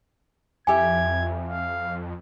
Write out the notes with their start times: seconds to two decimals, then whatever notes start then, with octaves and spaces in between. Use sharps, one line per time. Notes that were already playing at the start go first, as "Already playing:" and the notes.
0.67 F2 E4 G4 E5 G#5 G#6
1.49 F5